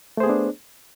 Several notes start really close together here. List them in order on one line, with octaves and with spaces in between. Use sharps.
A3 C5 G#4 B3 D4